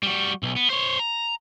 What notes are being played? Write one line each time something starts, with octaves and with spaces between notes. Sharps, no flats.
G3 F#4
B1
B3
C5 C#5
A#5